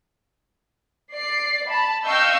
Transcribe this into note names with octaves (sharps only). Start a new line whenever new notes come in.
D5 C7
A5 B5
D#5 F5 G5 C#6 E6 G6